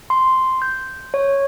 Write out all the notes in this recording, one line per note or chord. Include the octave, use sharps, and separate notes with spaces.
C6
G6
C#5